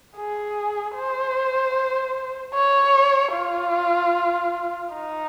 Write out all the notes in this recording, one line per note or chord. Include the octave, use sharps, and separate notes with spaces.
G#4
C5
C#5
F4
D#4